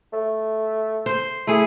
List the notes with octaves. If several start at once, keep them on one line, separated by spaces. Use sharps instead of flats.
A3
C5
A3 E4 G#4